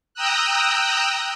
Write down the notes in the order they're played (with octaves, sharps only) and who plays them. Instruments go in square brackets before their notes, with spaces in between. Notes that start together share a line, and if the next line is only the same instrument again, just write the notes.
[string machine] G5 A#5 D#6 E6 F#6